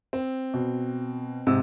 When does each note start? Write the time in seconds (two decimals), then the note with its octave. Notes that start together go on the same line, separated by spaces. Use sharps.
0.13 C4
0.54 B2
1.47 G#2 C3 E6